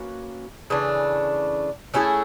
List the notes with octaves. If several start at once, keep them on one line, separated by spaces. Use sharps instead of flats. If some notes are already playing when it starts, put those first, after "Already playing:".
Already playing: A#3 C#4 F#4 B4
C#3 E3 A3 D4
A3 C#4 E4 G#4